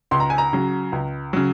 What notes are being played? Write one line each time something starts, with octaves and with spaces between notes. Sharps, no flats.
C#2 C6
A#5
G#5
A#5
C#3 F#3
C#2
C#3 F#3